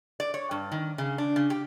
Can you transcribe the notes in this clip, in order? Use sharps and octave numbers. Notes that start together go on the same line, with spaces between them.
D5
C#5
G2
D#3
C#3
D4
C#3
G4